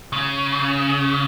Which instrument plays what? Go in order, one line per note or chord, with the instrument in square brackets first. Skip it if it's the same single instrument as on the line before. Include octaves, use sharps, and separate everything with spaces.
[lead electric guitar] C#3